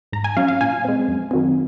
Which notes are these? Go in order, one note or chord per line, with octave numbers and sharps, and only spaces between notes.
G#2 A#5
G#5
F#3 C#4 F5
F5
A#2 G#5
G#3 C4
F#2
D#3 F#3 C4